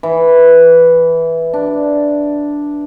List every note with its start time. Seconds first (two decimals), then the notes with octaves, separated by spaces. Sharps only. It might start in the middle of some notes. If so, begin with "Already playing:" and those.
0.03 E3
1.53 D4